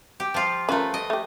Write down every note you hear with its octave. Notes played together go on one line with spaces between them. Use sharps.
G4
F3 F4
A3 C#4 F4 A#4 B4
D#5
A3 G4